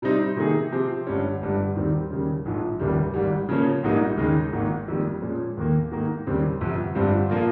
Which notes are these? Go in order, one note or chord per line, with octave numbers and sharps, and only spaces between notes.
C3 G3 C4 D#4
C3 D#3 A#3 D#4 G#4
C3 F3 C4 G4
G1 G2 G3 C#4
G1 G2 G3
D#2 D#3 G3 C4
D#2 C#3 G3 C#4
A#1 G#2 F3
F1 D#2 C#3 G3
G#1 G#2 G3
C#3 F3 A#3 C#4
A#1 G#2 G3 A#3 D#4
D#2 C#3 G#3 D#4
G#1 G#2 D#3 A#3
F2 D#3 G3 A#3
A#2 F3 G#3 C#4
D#2 D#3 A#3
G#2 D#3 A#3 D#4
D#2 C#3 G3 C4
G1 F2 C3
G1 G2 G3 C4 F4
A#2 F3 A#3 F4